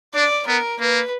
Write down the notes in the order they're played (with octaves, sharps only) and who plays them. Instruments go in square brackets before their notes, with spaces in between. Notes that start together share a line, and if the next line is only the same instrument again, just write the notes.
[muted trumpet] D4 [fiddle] D5
[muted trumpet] B3 [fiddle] A#4
[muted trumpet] A#3 [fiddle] B4